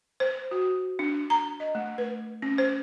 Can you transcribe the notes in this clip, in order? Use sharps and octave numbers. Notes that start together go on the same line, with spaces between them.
C5
F#4
D4
A#5
D#5
A3
B4
C#4
C5